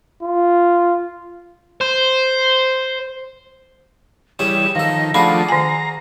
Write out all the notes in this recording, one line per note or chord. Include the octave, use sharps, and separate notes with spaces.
F4
C5
E3 G3 C#4 G#4 C#5 E7
D#3 F3 A4 A#6
F3 A3 D4 F#4 G#4 F5 B5 C7
D#3 G#5 A#5